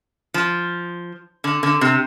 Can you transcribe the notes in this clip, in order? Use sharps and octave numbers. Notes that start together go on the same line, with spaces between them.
F3
D3
D3
C3